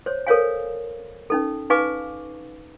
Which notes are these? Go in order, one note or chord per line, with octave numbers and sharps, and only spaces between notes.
C5 C#5
A4 A#4 C5 C#5 F5 G#5
C#4 D#4 A4
D#4 B4 F5 G#5 C#6 D6